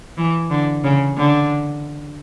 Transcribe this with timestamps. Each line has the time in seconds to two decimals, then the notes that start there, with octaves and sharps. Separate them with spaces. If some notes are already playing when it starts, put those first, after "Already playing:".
0.17 E3
0.50 D3
0.84 C#3
1.17 D3